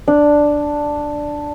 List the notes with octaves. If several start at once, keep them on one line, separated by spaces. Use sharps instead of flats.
D4